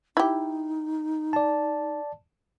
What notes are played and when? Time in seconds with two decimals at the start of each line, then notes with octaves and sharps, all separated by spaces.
0.17 D#4 E4 G4
1.33 D5 A5